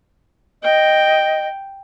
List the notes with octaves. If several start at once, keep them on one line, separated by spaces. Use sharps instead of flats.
D#5 G5